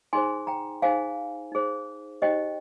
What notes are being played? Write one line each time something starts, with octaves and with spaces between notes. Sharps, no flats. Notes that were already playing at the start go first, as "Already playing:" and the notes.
D#4 G#4 C5 G#5 C6
G5 A#5
D#4 G#4 C5 F5 G#5
D#4 G#4 C5
D#4 G4 C5 D#5 G5